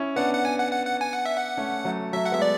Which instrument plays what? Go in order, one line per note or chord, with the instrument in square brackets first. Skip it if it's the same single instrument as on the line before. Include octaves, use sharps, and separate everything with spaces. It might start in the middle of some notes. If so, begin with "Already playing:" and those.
Already playing: [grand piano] C#4 E4
[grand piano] B3 D4 [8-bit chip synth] F#5
[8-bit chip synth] F#5
G#5
F#5
F#5
F#5
G#5
F#5
E5
F#5
[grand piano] A3 C#4
F#3 A3
[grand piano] F#3 A3 [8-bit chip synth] E5
[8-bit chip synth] F#5
[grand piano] G#3 B3 [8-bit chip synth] E5
[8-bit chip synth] D5